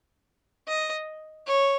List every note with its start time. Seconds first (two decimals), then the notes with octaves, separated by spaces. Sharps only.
0.68 D#5
1.47 C#5